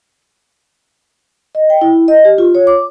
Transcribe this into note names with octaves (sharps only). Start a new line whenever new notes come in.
D#5
G5
E4
D#5
G4
F4
C#5
D6